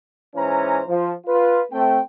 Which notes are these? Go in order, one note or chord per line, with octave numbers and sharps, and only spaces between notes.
G#2 E3 C#4 C5 A#5
F3
F4 B4
A3 C4 G5